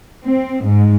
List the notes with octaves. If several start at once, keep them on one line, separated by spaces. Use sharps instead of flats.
C4
G#2